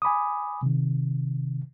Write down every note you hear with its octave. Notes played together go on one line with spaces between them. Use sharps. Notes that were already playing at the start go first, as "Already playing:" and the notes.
G#5 B5 D6 D#6
C3 D#3